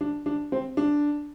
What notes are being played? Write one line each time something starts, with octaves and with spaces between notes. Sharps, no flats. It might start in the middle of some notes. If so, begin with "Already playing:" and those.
D4
D4
C4
D4